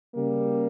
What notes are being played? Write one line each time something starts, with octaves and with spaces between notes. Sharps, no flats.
C#3 G3 A#3